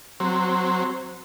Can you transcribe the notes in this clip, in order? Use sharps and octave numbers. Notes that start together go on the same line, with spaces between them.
F#3 C4